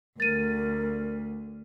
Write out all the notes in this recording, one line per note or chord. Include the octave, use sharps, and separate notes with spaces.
D2 A#4 A6 D#7